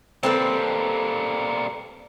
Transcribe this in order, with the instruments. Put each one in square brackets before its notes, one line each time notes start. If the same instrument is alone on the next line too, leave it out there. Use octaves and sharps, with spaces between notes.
[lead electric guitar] G3 A#3 [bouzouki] C4 A4 B4